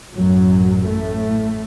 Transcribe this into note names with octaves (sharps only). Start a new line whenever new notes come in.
A1 F#2 A2 F#3
A2 A3